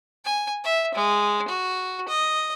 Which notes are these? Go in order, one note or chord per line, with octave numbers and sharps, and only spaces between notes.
G#5
E5
G#3
F#4
D#5